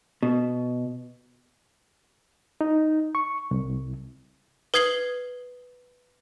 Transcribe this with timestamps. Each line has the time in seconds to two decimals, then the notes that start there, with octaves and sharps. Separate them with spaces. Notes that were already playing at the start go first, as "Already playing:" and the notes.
0.23 B2
2.61 D#4
3.15 C#6
3.51 C2
4.74 B4 D#6 G#6 C7 F#7 G7